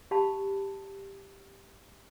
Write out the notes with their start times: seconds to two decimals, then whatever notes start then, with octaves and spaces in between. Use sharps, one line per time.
0.11 G4 F5 A5 B5